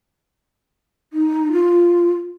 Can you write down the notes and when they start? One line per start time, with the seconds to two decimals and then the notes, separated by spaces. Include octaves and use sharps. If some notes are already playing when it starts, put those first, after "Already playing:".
1.13 D#4
1.52 F4